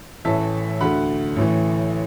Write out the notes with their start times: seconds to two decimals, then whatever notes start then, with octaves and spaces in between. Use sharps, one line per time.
0.25 A1 A2 E3 E5 A5
0.81 D2 D3 F#5 B5
1.36 A1 A2 E3